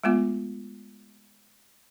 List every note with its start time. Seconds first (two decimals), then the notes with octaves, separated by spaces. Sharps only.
0.04 G#3 A3 B3 F4